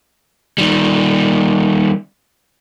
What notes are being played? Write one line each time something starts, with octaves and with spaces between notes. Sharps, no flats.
D#3 G3